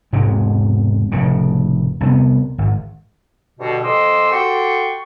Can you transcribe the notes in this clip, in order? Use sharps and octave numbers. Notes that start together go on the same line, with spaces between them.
E1 G#2 C3 G#3
F1 A2 C#3
C2 C3 B3
G#1
G2 B2 D3
F2 D#5 G#5 C6 D6 E6
F#4 G4 A4 G5 C6 C#6